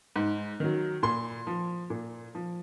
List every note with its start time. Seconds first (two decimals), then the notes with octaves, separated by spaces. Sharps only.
0.16 G#2
0.60 D#3 F#3
1.03 A#2 C6
1.47 F3
1.90 A#2
2.35 F3